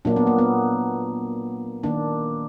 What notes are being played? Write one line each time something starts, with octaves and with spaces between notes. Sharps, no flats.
A#2 F#3 A#3 D4
B3
A#3
B3
D#3 A#3 D4